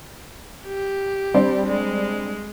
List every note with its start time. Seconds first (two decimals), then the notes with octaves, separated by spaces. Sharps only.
0.66 G4
1.34 G3 C4 D4
1.66 G#3